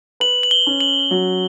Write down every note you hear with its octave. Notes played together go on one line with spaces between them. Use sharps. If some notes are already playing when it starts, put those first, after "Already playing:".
B4 F#7
F#7
G7
C#4
F#7
F#3